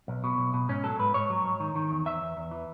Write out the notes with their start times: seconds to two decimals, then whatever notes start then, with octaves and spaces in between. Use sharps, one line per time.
0.08 B1
0.24 B2
0.38 B1
0.54 B2
0.69 G#2 C#4
0.84 F#3 A4
0.99 G#2 B4
1.14 G#2 C#5
1.30 F#3
1.45 G#2
1.60 D#3
1.75 D#3
1.91 E2
2.06 E2 E5
2.21 E2
2.37 E2
2.51 E3